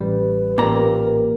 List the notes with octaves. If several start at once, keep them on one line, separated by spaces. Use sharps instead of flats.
A1 G3 B4
A1 A#2 G4 A#4 A#5